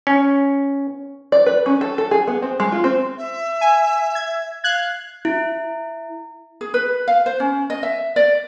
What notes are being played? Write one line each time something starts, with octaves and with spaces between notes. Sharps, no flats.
C#4
D5
B4
C#4
A4
A4
G#4
B3
C4
G#3
F4
C4
E5
G#5
G#6
F5 F#6 G#6
E4
G#4
B4
F5
C5
C#4
D#5
E5
D5